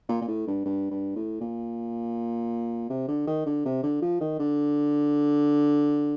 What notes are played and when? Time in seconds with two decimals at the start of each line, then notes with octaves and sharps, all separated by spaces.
0.09 A#2
0.21 A#2
0.28 A2
0.47 G2
0.65 G2
0.91 G2
1.16 A2
1.41 A#2
2.90 C3
3.08 D3
3.27 D#3
3.46 D3
3.65 C3
3.83 D3
4.02 F3
4.20 D#3
4.39 D3